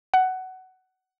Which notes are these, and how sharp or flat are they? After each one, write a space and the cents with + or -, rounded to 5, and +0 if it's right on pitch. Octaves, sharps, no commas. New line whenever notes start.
F#5 +15